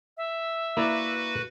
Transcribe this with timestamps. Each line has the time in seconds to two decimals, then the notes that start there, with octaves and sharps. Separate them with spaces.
0.17 E5
0.77 A#3 E4 F#4 B4 D5